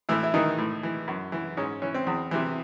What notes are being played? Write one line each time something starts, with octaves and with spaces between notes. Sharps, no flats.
A2 E3 E4
E4
D#3 E3 D#4
A2
E3
F#2
E3
G#2 C#4
E3 C#4
C4
E2
C3 E3